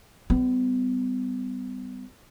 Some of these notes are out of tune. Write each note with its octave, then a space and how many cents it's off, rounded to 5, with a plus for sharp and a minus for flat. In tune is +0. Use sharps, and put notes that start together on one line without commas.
G3 +0 B3 +40